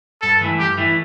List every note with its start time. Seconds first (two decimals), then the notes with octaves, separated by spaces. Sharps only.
0.22 G2 A4
0.41 E3 A3 E4
0.58 G2 G4
0.77 E3 A3 E4